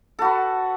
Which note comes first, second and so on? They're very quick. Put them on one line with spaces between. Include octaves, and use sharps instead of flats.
A4 F#4 B4